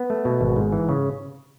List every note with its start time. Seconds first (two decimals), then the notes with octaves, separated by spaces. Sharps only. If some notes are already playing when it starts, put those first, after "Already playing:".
Already playing: B3
0.10 A3
0.25 B2
0.41 G#1
0.56 G#2
0.72 E3
0.89 C#3